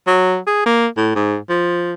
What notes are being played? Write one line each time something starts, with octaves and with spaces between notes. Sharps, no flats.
F#3
G#4
A#3
A2
G#2
F3